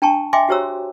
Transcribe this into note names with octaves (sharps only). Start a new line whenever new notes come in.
D4 G5 A5 A#5 C#6
D#5 E5 G5 G#5 C6 D6
F#4 G4 C5 C#5 A#5 E6